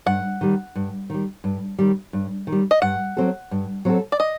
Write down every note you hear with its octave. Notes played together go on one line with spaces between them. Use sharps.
G2 F#5
D#3 G3
G2
D#3 G3
G2
D#3 G3
G2
D#3
G3
D#5
G2 F#5
F#3 C4 F#4 A4
G2
F#3 C4 F#4 A4
D5
D#5